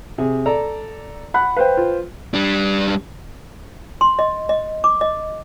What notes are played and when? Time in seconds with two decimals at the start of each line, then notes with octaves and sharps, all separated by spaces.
0.18 C3 G#4
0.46 A4 D5 A#5
1.34 F#5 B5 F#6
1.57 B4 C5 F5 G5
1.77 F4
2.34 G3 D4
4.01 C6
4.19 D#5
4.49 D#5
4.84 D6
5.01 D#5